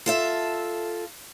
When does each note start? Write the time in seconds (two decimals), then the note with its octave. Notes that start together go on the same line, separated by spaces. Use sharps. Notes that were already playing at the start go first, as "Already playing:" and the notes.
0.06 F4 A4 E5